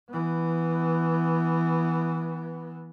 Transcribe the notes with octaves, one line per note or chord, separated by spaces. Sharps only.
E3 B3